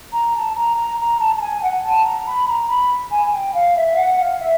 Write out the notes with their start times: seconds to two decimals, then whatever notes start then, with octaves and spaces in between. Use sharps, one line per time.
0.13 A#5
0.35 A5
0.56 A#5
0.77 A#5
0.99 A#5
1.20 A5
1.36 A5
1.41 G#5
1.63 F#5
1.84 A5
2.06 A#5
2.27 B5
2.48 A#5
2.69 B5
3.11 G#5
3.33 G5
3.54 F5
3.76 E5
3.89 F5
3.97 F#5
4.18 F5
4.40 E5